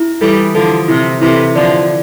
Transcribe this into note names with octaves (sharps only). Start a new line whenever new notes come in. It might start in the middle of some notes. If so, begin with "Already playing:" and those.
Already playing: E4
E3 G3 A4
D3 F3 A4
C3 E4
C3 E3 E4
D3 F3 D5